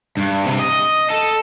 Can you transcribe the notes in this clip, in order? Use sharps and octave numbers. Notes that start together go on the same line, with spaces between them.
G2
C3
D#5
A4